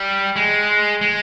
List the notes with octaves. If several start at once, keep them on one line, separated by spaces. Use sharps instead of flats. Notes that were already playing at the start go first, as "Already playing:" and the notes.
Already playing: G3
G#3
G#3